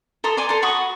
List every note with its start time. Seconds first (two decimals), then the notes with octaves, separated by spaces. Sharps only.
0.24 A4 A#5 C6 D#6
0.37 D5 G#5 C6
0.49 A4 A#5 C6
0.62 F#4 B5 C#6 D#6